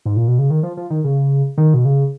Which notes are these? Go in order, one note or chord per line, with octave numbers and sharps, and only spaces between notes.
G#2
A#2
B2
C#3
D#3
F3
F3
D#3
C#3
D#3
B2
C#3